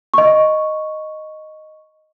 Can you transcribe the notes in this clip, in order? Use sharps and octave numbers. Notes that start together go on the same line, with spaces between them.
D#5 C#6